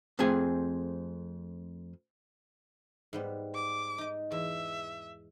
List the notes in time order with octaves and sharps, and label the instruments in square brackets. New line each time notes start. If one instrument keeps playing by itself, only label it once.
[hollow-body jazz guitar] F2 A3 C4 G#4 G#5
[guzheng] G#2 G3 B3
[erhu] D6
[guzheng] D#4 D#5
[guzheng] E2 [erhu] E5